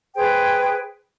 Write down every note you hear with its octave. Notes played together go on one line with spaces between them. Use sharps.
G#4 B4 C5 G5